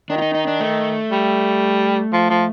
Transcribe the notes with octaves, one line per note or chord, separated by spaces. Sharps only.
D#3 D4
F4
D#4
D#4
D4
A3
G3
F3
F3